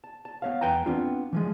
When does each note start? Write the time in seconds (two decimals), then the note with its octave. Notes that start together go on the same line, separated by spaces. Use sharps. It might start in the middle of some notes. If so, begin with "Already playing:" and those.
0.04 A5
0.25 A5
0.42 B3 C#5 F5
0.61 E2 B4 G5 G#5 A#5
0.86 B3 C4 D4 F4
1.33 E3 F3 G#3